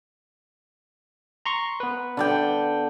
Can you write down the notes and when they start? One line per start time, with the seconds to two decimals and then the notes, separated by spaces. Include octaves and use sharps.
1.46 A#5 C6 C#6
1.80 B3 B4
2.17 D3 D5 G5